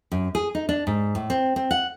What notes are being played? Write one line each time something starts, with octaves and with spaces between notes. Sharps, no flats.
F#2
G#4
D#4
D4
G#2
A2
C4
C4
F#5